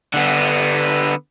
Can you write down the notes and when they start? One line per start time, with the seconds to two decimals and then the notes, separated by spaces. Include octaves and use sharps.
0.14 D3 B3